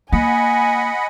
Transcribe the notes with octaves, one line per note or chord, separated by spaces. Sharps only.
A#3 D#5 F#5 G#5 B5